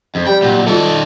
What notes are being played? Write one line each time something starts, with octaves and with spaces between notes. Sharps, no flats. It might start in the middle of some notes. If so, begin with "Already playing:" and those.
F2
G3 G5
A#2 F#3
D#3 G3 F4 A4 D5